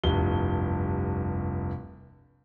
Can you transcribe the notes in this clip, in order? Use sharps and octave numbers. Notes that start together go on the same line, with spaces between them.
F1 C2 G2 G7